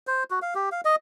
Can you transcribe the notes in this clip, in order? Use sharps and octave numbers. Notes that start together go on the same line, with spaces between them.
C5
F#4
F5
G4
F5
D#5